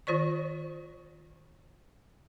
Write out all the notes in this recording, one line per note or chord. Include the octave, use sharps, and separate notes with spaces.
D#3 F4 C5 D5 C#6